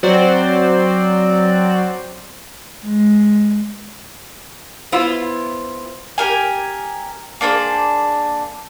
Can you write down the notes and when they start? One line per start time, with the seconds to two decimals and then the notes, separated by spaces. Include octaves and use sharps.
0.03 F#3 C4 F#4 C5 D5
2.84 G#3
4.92 B3 E4 F4 C5
6.18 G4 A#4 G#5
7.41 A#3 D4 G#4 C5